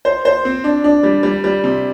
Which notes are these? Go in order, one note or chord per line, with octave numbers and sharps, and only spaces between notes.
C5
C5
C4
D4
D4
G3
G3
G3
C3